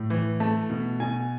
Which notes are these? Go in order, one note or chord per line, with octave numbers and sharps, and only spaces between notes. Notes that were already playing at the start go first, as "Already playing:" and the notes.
Already playing: A2
E3
A3 A5
B2
B2 G#5